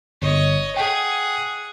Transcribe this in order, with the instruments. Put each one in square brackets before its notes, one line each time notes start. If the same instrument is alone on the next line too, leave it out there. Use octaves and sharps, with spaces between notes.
[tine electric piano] G1 [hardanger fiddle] C#5 D#5
[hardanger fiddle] G#4 F#5 [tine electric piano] G5